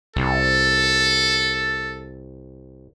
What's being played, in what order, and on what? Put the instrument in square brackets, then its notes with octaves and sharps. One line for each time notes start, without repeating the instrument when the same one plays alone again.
[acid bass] C2 [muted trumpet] A4